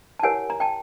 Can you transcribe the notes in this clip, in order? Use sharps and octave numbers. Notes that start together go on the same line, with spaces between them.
A5
E4 G4 A#4 C#5 F#5 G#5
A#5
G5 A5